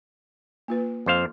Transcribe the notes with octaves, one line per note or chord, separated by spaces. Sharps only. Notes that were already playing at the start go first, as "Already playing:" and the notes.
A#3 F4 B4
F2 C5 F5